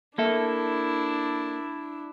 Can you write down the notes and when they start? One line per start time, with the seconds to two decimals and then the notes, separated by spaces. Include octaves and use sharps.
0.18 A#3 D4 E4 A4 E5